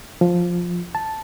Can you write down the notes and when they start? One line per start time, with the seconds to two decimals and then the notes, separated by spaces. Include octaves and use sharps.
0.21 F3
0.95 A5